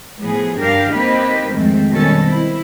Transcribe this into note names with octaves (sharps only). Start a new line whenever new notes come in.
A2 F3 B3 G#4
G2 D4 G4 A#4 F5
A#3 C4 D#4 G4 B4
F2 G#2 D#3 G#3 A3 C4
B2 D#3 G3 C#4 A4
C4 E4